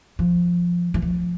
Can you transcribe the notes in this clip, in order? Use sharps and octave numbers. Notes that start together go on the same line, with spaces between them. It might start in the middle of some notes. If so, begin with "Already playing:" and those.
F3
E3
F3